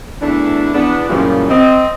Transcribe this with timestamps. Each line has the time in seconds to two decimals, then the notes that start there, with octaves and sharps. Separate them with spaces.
0.22 E2 E3 A3 D4
0.74 E2 B3 D4
1.09 F#2 A#2 C#3 E3 F3 G3
1.49 C4 D#5